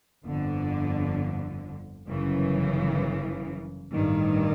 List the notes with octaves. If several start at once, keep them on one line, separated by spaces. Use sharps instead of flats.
G1 F2 D3
G1 F#2 C#3 E3
A1 G2 D#3